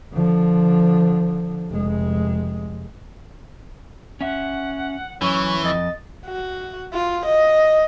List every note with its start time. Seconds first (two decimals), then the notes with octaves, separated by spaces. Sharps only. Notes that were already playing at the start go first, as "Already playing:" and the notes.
0.13 D3 F3
1.70 F1 G#3
4.21 C#4 E5 F#5
5.22 F#2 E3 C#4 C#6
5.64 F2 D#5 A6
6.26 F#4
6.93 F4
7.26 D#5